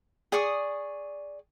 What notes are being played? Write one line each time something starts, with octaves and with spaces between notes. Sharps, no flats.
G#4 D5 C#6 D#6